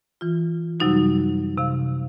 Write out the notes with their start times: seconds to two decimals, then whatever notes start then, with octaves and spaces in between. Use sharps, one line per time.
0.21 E3 F4
0.80 F#2 C3 F#3 G3 D#4 F#4
1.58 C3 F5